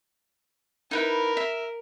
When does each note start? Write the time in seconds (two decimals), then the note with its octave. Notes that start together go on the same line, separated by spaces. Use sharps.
0.91 D#4 E4 A#4 B4
1.37 E5